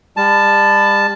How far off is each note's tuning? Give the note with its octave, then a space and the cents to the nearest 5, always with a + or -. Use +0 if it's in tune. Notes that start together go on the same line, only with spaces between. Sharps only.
G3 +40 A5 +0